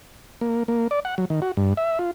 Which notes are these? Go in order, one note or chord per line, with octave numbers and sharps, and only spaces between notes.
A#3
A#3
D5
F#5
F#3
D#3
F#4
G2
E5
F4